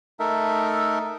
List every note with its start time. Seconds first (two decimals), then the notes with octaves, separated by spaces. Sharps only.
0.20 A3 D#4 A4 A#4 E5